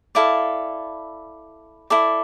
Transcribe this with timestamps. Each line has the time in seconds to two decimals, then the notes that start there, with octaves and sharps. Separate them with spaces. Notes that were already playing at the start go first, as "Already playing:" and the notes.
0.15 E4 A4 D5 F5
1.90 E4 A4 D5